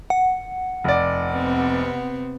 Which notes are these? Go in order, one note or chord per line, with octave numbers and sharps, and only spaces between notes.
F#5
F1 D5
C3 B3 C4